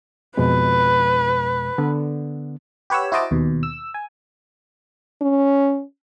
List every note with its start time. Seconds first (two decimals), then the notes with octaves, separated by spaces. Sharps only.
0.37 F2 B2 G#3 B4
1.78 D3 B3
2.90 G4 B4 C#5 F#5 E6
3.12 E4 F#4 C5 D#5 A5 D6
3.31 D#2 B2
3.63 E6
3.94 G#5
5.22 C#4